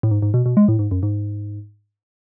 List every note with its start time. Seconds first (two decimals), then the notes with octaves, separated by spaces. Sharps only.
0.03 A2
0.11 G#2
0.22 G#2
0.34 B2
0.46 B2
0.57 G#3
0.68 A2
0.79 G#2
0.91 F#2
1.03 G#2